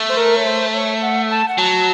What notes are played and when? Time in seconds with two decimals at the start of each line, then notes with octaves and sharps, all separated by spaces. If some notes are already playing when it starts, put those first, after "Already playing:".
Already playing: A3
0.09 C5
0.17 A#4
0.36 C#5
0.46 C5
0.74 C#5
1.02 F#5
1.30 A5
1.48 F#5
1.58 F#3 A5